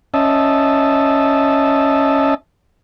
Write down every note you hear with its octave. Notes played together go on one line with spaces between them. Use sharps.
C#4 D#5 E5 A5